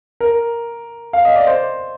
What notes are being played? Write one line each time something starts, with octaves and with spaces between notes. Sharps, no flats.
A#4
F5
D#5
D5
C5